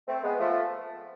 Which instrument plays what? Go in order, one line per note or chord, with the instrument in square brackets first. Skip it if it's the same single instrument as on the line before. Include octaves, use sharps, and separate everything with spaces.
[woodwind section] A3 C4
G#3 B3
F3 A3